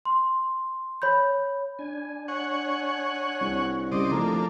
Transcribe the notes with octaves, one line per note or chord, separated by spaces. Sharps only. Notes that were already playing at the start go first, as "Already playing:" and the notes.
C6
C#5 B5 G6
D4 G#5
C#5 F#5
C2
C#3 G3 C5 D5 D#5
F3 A3 A#3 D4